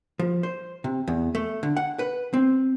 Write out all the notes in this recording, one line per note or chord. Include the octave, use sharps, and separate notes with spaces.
F3
C5
C3
E2
A3
D3
F#5
B4
C4